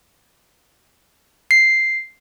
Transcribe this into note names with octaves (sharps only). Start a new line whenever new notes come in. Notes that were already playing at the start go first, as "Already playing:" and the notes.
C7